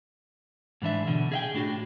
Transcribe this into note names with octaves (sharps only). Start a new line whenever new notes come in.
G#2 E3 D4 E5
B2 D3
G#4 E5 G5
A2 D4 F#4